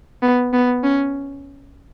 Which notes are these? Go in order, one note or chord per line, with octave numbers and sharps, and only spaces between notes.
B3
B3
C#4